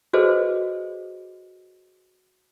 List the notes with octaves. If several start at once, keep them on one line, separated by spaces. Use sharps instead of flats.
F#4 G#4 A4 B4 C5 D#5